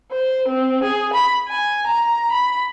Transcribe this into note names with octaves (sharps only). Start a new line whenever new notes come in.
C5
C4
G#4
B5
G#5
A#5
B5